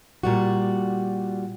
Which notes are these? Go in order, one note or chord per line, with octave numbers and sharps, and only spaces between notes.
A#2 G3 F#4